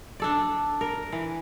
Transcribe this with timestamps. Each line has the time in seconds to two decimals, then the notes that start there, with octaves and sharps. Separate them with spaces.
0.20 D4 A4 D5
0.81 A#4
1.12 E3